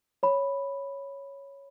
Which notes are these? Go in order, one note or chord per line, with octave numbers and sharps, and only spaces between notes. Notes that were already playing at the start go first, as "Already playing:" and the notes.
C#5 B5